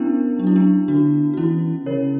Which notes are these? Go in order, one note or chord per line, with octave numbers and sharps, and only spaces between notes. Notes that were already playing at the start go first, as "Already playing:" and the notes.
Already playing: B3 C#4 D4 E4 A#4
F#3 D4
E4
B3 D4
D3 D4 F#4
F#4
E3 C#4 E4
C#3 A#4 C#5